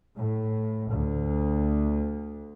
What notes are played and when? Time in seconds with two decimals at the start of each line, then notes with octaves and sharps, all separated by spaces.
0.17 A2
0.89 D2